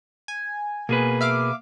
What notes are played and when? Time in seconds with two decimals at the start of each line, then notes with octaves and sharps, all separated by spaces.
0.28 G#5
0.89 B2 A#3 G#4 B4
1.21 E5 F5 D6